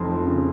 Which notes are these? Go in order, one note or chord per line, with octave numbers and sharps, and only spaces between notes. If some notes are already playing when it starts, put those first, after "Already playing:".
Already playing: F1 F2 C6
F3
C#3